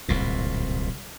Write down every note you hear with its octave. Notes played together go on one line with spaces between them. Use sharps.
D1 C2 A#2